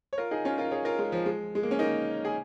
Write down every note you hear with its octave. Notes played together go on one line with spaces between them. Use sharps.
C#5
F4 A#4
D#4 G#4
C#4 F4
F4 A#4
G#4 C#5
F4 A#4
G#3
F3
G#3
G#3
A#3
C#4
A#3 D#4
G#4